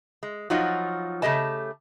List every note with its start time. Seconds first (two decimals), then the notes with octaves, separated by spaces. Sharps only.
0.23 G#3
0.50 F3 F#3 D#4 F4 F#4
1.22 C#3 A3 G4 D#5 A5